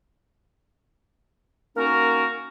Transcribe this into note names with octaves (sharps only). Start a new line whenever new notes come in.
A#3 C#4 D#4 F#4 A#4